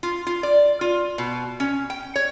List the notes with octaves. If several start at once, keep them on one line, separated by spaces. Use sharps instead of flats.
F4
F4
D5
F4
B2
C#4
G5
C#5